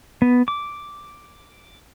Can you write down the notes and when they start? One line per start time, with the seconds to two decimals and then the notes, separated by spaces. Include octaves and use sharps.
0.22 B3
0.48 D6